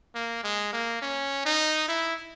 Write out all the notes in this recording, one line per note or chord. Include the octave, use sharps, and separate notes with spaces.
A#3
G#3
A#3
C#4
D#4
E4